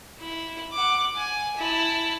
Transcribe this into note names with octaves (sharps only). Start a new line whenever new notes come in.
E4
F#5 D6
G#5
E4 A5